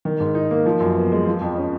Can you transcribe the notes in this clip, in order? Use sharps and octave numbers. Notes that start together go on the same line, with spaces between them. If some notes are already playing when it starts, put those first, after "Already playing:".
D#3
G#2
D#4
A#3
F3
F#2
B3
G#3
F3
F2
C#4